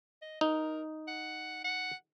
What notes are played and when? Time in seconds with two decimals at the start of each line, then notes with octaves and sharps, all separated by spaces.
0.22 D#5
0.41 D#4 A#4
1.08 F#5
1.64 F#5